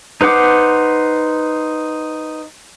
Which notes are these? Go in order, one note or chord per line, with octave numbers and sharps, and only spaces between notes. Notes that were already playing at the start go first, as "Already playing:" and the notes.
D#4 B4 C5 F#5 D6